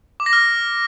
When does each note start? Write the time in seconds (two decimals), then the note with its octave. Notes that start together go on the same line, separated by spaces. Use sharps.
0.20 D6
0.26 A#6
0.33 F6